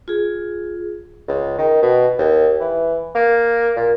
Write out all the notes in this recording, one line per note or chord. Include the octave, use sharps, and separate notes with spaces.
F4 G#4
C#2
D#3
B2
D#2
E3
A#3
A#2